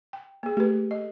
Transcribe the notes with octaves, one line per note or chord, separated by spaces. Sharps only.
G5
A#3 G#4
A3 G4 B4
D#5